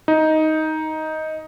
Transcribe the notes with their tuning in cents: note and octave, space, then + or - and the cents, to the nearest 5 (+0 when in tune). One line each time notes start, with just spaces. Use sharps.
D#4 +10